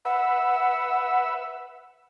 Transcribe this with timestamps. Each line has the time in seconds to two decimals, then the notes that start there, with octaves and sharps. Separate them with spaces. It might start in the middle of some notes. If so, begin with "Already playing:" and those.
0.05 B4 E5 F#5